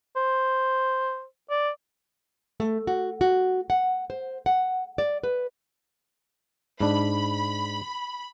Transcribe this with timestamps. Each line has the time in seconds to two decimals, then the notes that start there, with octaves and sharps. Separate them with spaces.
0.16 C5
1.50 D5
2.60 A3
2.87 F#4
3.21 F#4
3.70 F#5
4.10 C5
4.46 F#5
4.98 D5
5.23 B4
6.80 G#2 D4 B5